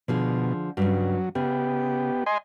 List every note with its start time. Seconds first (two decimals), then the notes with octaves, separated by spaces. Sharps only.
0.08 B2 D3 F3 G#4
0.77 G2 C#3 F#3
1.35 C#3 B3 G4
2.26 D#5 G#5 C6